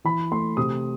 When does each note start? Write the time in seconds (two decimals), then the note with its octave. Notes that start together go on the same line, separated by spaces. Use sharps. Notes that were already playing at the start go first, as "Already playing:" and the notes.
0.05 E3 B5
0.31 A3 C6
0.57 C3 D#6